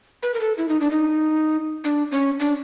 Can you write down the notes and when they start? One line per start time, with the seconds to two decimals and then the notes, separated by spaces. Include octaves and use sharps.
0.23 B4
0.34 A#4
0.40 A4
0.58 E4
0.69 D#4
0.81 D4
0.91 D#4
1.84 D4
2.11 C#4
2.40 D4